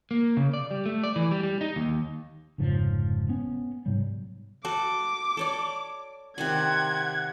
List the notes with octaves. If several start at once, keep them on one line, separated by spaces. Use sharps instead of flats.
A#3
C#3
D5
G3
A3
D5
E3
G3
G3
D#4
D#2
F1 G#2 C#3 F3
B3 C#4
G#2 C3 F#3 G3
F#4 A4 D6
A4 C#5 D5
C3 D#3 D5 F#5 G#6